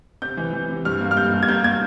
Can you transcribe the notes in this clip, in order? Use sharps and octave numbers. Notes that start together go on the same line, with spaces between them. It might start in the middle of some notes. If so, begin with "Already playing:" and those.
C3 G6
E3
E3
C3
G2 F6
A#3
F6
G2 G6
G2
G#6
A#3 G6
A#3 G#6